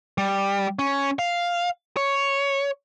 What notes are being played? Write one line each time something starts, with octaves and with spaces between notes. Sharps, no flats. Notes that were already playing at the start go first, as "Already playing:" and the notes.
G3
C#4
F5
C#5